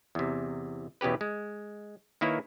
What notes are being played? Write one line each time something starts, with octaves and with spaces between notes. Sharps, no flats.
E2 C3
E2 B2 C#4 G4 B4
G#3
D#3 A#3 E4 B4 C#5